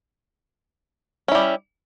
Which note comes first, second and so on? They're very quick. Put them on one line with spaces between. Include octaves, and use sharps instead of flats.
C#4 E4 G3